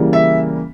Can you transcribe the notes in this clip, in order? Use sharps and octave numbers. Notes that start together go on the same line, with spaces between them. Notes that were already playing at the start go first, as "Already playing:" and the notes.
Already playing: C#3 E3 G3 A#3
E5